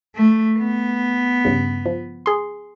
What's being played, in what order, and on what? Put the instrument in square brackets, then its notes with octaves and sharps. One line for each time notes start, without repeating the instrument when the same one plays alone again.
[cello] A3
B3
[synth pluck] G2 C#3
F3
G#4 C6